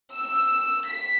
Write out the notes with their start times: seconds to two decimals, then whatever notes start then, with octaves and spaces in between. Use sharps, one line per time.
0.15 E6
0.87 B6